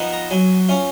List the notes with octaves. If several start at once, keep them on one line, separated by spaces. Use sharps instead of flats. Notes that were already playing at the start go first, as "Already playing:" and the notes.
Already playing: F3 B3 D#4
A#5
F#3 G#5
C#4 F4 F5